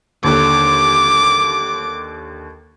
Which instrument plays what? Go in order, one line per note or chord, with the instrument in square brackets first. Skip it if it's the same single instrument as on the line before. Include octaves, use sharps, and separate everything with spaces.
[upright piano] D#2 D3 [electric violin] D6